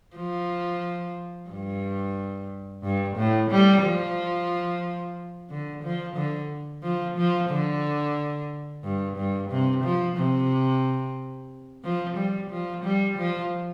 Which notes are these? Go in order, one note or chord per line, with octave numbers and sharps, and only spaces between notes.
F3
G2
G2
A2
G3
F3
D3
F3
D3
F3
F3
D3
G2
G2
C3
F3
C3
F3
G3
F3
G3
F3